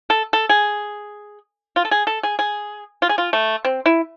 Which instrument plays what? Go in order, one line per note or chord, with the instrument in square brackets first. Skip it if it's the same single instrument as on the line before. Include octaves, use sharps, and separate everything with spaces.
[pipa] A4
A4
G#4
F4
A4
G#4
A4
G#4
G#4
F4
G#4
F4
A3
C4
E4